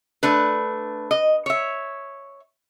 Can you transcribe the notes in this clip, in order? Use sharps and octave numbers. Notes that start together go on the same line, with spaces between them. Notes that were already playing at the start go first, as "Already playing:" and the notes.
A3 D4 B4
D#5
C#5 E5